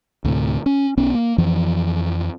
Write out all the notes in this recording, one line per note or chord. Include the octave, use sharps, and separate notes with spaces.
D2 A2 C3
C#4
B1 B3 C#4
A#3
F2 E3 F3